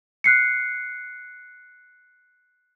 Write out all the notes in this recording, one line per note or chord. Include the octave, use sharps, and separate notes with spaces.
F#6 C7 C#7